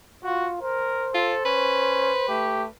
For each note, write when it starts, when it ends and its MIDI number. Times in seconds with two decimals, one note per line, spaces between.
0.24 0.58 65
0.24 0.50 66
0.61 1.09 70
0.61 2.28 72
1.14 1.34 65
1.14 1.42 69
1.45 2.12 61
1.45 2.71 71
2.29 2.68 57
2.29 2.63 67